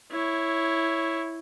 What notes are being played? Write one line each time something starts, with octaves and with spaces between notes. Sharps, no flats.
E4 C#5